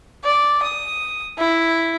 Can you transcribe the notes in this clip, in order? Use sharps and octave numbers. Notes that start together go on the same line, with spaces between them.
D5
D#6
E4